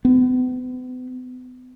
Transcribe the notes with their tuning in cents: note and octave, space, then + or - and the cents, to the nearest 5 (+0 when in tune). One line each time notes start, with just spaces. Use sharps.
B3 +40